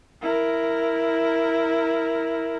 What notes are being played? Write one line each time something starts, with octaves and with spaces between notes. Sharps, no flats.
E4 A#4